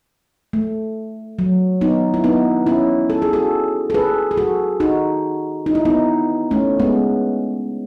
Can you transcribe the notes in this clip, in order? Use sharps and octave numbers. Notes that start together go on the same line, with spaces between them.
A3
F#3
B3 D#4
E4
B3 D#4
C#4 E4
A4
G#4
F#4 A4
A4
G#4 B4
G#4
F#4 A4
D#4 F#4
D#4
E4
B3 D#4
A3 C#4
G#3 B3